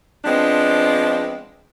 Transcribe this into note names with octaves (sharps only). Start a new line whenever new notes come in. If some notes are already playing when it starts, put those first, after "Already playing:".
F3 G#3 B3 C4 D4